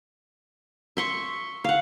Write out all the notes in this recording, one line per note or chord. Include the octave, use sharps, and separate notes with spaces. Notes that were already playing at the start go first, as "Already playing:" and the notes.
E5 C6 C#6
F5 F#5